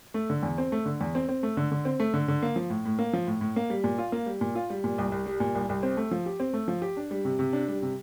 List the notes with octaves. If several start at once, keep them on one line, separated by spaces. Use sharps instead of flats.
A3
D3
E2
C4
A3
D3
E2
C4
C4
A3
D3
D3
C4
A3
D3
D3
A#3
F3
A2
A2
A#3
F3
A2
A2
A#3
G3
A#2
F4
A#3
G3
A#2
F4
G3
A#2
C2
C2
G3
A#2
C2
C2
C4
A3
F3
G4
C4
A3
F3
G4
D4
G3
C3
C3
D4
G3
C3